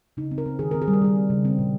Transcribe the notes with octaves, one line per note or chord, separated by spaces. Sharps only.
C#3 D#4
C4
A#4
C4
D#3 G#4
C4 A#4
G#4
G3
A#4
G3 G#4
C4
C#3
C4
A#2